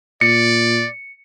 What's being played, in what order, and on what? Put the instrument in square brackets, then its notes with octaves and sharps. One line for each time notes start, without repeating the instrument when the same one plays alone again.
[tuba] A#2 [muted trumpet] D5 [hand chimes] C#7